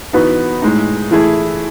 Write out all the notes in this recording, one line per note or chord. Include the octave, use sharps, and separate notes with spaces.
E3 B3 D#4 F#4 B4
A2 G#3 D#4
E3 A3 E4 G#4